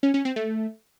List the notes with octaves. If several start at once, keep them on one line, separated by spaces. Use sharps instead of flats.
C#4
C#4
C4
A3